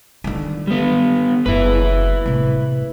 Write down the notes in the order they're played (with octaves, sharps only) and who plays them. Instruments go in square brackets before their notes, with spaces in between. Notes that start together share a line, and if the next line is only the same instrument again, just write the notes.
[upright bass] D3 D#3
[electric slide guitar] G3 B3
[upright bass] F#1 C#4 [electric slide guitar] E4 B4
[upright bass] A2 C3